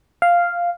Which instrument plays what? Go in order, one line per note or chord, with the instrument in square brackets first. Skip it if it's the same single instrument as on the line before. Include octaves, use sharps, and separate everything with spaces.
[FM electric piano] F5